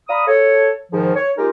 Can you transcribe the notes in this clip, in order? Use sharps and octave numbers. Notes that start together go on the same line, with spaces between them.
D5 F5 A#5 B5 D#6
A4 C#5
G#2 D#3 F3
C#5
G#3 A#3 D#4 F4 G4 A#4